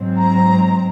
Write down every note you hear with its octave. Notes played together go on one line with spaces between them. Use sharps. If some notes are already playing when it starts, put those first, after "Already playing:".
Already playing: G#2 F#3 C4
A#5